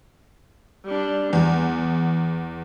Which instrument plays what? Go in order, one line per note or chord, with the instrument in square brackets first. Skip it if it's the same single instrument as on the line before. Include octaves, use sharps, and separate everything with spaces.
[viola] G3 D4
[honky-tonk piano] E2 [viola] B3